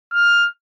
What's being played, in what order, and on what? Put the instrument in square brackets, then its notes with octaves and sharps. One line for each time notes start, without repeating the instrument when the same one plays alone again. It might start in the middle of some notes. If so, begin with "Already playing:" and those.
[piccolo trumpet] F6